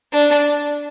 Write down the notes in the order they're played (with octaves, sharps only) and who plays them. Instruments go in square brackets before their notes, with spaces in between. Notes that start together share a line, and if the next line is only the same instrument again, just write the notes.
[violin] D4